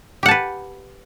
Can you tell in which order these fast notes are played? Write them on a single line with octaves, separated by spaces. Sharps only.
G4 F#5 A5 B4